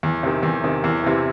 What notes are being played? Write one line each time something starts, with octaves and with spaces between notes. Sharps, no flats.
E2
C3 D#3
E2
C3 D#3
E2
C3 E3